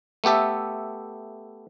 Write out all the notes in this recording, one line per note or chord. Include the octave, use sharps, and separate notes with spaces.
A3 B3 G4 A4 E5